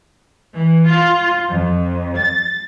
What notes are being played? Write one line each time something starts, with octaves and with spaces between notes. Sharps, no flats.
E3
F4
F2
A6